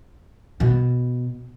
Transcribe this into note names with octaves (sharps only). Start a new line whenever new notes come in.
B2